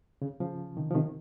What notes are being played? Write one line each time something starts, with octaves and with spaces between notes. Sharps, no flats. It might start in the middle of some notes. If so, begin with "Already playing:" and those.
C#3
C#3 F3
C3 D#3
F3
C3 D#3